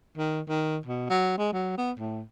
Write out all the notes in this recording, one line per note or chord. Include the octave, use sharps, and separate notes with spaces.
D#3
D#3
B2
F#3
G#3
F#3
B3
A2